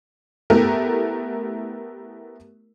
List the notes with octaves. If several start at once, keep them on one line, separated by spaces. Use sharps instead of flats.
A3 B3 E4 G4 A#4